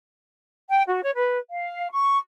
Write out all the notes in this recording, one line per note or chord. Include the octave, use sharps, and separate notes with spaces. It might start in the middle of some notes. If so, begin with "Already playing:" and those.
G5
F#4
C#5
B4
F5
C#6